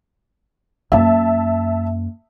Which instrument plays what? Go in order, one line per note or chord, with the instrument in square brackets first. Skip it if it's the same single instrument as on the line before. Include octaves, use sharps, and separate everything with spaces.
[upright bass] F#2 A#3 [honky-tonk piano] E5 A5